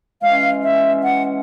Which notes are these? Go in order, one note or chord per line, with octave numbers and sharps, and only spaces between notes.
E3 G#3 C#4 F5
E5
F#5